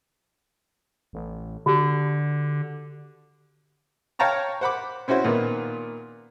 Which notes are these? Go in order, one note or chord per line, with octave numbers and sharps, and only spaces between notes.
A1
D3 F#4 G4
C#5 F5 G5 A5 A#5 C#6
C5 F#5 B5 D6
C4 C#4 E4 F#4 C5
A#2 D#3 B3